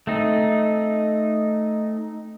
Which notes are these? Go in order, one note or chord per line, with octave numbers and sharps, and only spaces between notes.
A3 C4 D#4